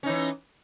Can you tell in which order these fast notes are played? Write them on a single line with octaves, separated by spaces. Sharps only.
C#4 D#4 E3